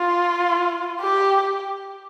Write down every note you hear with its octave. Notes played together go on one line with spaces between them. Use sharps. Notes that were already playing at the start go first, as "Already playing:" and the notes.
Already playing: F4
G4